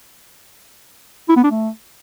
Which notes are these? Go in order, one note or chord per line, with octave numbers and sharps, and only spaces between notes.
E4
B3
D4
A3